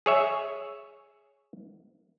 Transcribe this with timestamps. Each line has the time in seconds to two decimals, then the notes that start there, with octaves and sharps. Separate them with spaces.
0.06 G#4 C#5 E5